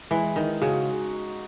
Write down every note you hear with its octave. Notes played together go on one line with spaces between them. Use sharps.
E3 G#3
D#3 D#4
C#3 F#4